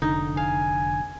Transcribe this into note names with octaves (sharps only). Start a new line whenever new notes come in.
F1 D3 D#4
F5 G#5